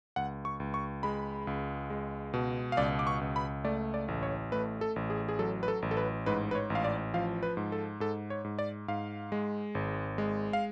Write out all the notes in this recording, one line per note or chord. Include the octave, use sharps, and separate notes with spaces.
C#2 F#5
C#6
C#2
C#6
G#3 B5
C#2
G#3
B2
F5
C#2 D5
D6
C#6
C#2
B5
A3 D5
D5
A1
C#5
A3 B4
A4
A1
G#4
G#4
F#3 A4
B4
A4
A1
A4
B4
G#2 B4
B4
C#5
A1
F5
D5
F3 F5
B4
G#2
A4
G#2 A4
C#5
G#2
D5
G#2 F5
G#3
G#1
G#3
F5